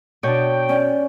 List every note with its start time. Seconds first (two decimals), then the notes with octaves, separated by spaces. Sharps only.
0.23 B2 D4 C#5 G5
0.69 C#4 D5